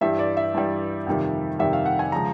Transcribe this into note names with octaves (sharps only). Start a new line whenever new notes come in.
G2 E3 G3 E5
D5
E5
G2 E3 G3
F2 C3 D#3 G3
F2 C3 D#3 G3 E5
F5
F#5
G#5
C#3 F3 G#3 A#5